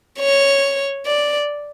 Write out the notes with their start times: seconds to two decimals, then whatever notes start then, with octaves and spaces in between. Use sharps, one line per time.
0.19 C#5
1.06 D5